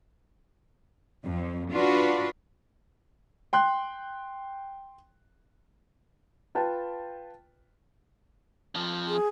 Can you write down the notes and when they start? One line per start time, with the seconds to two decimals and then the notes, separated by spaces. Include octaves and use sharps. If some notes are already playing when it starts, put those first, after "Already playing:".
1.25 F2
1.72 D4 F4 F#4 B4
3.53 G5 C6 F#6
6.55 F4 B4 G5 A5
8.75 F2 F3
9.07 G#4